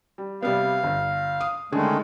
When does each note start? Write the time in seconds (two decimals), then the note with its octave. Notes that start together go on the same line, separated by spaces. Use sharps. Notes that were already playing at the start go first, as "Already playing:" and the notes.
0.18 G3
0.43 C3 G3 B3 F5
0.84 G1
1.41 D#6
1.72 D3 D#3 G#3 A3 C#4 G#4